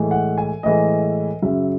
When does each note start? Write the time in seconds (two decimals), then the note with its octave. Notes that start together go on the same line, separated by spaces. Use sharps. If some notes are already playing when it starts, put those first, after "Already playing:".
Already playing: A2 E3 G#3
0.11 F#5
0.38 G#5
0.63 A2 E3 G#3 D#5
1.42 F#2 C#3 F#3 E5